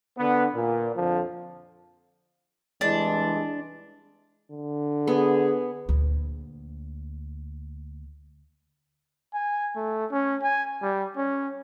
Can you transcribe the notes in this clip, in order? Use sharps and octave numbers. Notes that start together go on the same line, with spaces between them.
D3 B3
A#2
F2 D3 F3
C2 E3 G#3 D4
D3
B3 G#4
D2 A#2
G#5
A3
C#4
G#5
G3
C#4